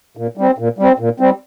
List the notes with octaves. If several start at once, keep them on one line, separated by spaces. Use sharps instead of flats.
A#2
G3 C4
A#2
G3 C4
A#2
G3 C4